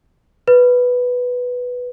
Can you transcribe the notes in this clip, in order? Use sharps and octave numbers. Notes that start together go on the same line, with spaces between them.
B4